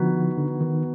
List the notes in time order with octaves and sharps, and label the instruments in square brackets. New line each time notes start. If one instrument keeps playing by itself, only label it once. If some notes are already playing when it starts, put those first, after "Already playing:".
Already playing: [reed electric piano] D3 F3 [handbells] B3 D#4 F#4 B4
[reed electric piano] D3
D3
D#3